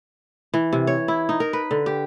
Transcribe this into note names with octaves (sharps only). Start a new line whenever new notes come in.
E3
C3
C#5
E4
D#4
A#4
B4
D3
G4